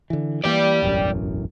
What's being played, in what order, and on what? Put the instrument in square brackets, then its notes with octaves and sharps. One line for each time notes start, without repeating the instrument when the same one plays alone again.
[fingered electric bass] D3 E3
[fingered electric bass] E3 A#3 [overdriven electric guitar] G4 D5
[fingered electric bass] E1 A1 F#2